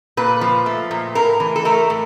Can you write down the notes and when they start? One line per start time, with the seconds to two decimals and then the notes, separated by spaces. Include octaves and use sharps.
0.17 A#2 B4
0.41 F3
0.66 A3
0.91 A#2
1.15 A2 A#4
1.40 E3
1.56 A4
1.65 A3 A#4
1.90 A2